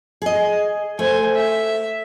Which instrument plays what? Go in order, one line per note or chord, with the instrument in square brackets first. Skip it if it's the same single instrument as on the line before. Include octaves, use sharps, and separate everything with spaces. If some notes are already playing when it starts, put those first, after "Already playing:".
[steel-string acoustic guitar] G#4 D#5
[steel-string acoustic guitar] A3 [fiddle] C5 G#5
[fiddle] E5